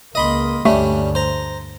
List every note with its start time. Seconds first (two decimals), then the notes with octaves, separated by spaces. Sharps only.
0.15 C#2 A#3 D#5 B5 C6
0.65 D2 G2 G3 A3 C#4 D4
1.15 C5 A#5